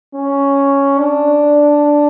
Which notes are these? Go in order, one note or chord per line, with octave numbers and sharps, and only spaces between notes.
C#4
D4